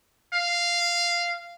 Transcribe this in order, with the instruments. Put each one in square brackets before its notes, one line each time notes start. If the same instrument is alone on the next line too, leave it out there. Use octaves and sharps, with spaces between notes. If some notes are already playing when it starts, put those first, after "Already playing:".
[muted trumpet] F5